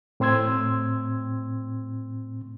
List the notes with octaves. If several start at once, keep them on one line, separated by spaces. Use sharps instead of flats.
A2 C4 C6 E6 G#6